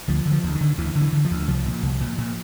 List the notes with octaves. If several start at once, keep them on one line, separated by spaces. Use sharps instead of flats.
D2 F3
D3
F3
D2
D#3
D3
D2 E3
D3
E3
D3
F3
D2
C2 F3
A#2
C2
A#2
A#2